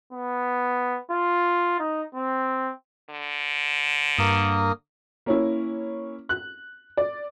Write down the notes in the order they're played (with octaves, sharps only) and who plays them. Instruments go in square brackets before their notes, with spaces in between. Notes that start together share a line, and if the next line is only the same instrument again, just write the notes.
[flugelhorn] B3
F4
D#4
C4
[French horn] D3
[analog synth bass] G2 [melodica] A#3 A#4 D#6
[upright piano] A#3 C#4 E4
F#6
D5